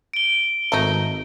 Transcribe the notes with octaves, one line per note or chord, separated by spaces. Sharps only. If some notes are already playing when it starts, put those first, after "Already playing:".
D7 G7
G#1 A3 D#4